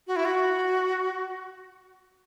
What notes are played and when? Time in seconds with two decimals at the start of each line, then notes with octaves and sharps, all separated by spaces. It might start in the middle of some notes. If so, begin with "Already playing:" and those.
0.07 F#4
0.16 E4
0.25 F#4